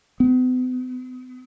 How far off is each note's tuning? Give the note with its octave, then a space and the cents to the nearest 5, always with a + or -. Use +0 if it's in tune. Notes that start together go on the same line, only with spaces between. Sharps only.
B3 +45